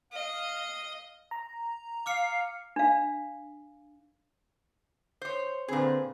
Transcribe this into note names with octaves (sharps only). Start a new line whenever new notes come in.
D#5 F5
A#5
F5 D6 F6 C#7
D4 F5
C5 C#5
A#2 D3 C4 G#4 B4